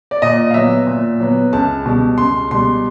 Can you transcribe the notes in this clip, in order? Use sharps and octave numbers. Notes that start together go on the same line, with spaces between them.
D5
A#2 D#5
F5
F#3 B3 E5
A#2
F#3 B3
C#2 A5
B2 G3
C#2 C6
B2 G3 C6